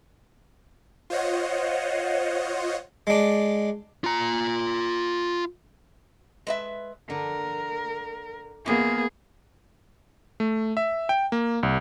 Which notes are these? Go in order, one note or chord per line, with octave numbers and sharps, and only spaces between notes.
F4 C5 C#5 D#5 F#5
G#3 D4
F4 A#5
G#3 B4 E5
D3 A#4
F#2 A#2 A#3 B3 G#4
A3
E5
G5
A#3
C2